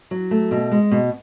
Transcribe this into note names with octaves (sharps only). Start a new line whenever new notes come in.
F#3
A3
B2
G#3
B2